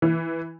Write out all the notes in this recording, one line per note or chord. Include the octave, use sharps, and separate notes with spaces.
E3